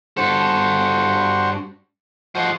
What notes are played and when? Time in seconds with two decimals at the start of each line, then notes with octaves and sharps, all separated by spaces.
0.17 G2 F#4 A4 C5
2.35 F3 F#4 C5 D#5